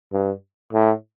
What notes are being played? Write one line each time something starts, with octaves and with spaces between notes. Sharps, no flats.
G2
A2